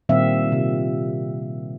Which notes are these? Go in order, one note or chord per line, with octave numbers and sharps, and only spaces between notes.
A#2 D#3 G3 C4 E5 F5
C3